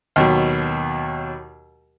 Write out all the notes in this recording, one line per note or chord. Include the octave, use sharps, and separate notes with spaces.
D#2 B2 F#3